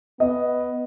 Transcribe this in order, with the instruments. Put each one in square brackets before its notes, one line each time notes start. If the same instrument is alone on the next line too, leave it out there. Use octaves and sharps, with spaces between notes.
[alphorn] B3 [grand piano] D#5